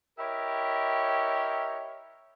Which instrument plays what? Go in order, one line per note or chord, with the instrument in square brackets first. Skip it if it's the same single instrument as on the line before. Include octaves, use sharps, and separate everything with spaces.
[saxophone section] E4 G4 A#4 C#5 D#5 E5